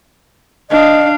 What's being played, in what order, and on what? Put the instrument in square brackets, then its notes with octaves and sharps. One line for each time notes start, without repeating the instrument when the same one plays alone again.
[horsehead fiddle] D4 F5 [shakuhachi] D#5